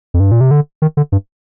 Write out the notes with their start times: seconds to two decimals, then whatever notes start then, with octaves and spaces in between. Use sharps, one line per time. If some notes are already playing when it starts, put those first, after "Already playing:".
0.14 F2
0.20 G2
0.32 A#2
0.41 C3
0.51 D3
0.82 D#3
0.97 D3
1.12 G2